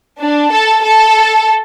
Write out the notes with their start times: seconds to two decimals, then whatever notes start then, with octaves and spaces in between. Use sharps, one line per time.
0.21 D4
0.52 A4
0.83 A4